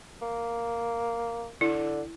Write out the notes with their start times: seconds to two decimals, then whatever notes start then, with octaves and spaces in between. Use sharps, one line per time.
0.22 A#3
1.61 D3 E4